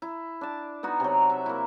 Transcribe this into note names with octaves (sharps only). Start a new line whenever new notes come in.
E4
D4 A5
B3 D#4 F#4
C3 F#3
E5
A#3 E4